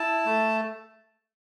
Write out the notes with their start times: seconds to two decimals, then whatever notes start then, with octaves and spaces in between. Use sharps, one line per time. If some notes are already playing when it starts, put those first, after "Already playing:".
Already playing: E4 A5
0.25 A3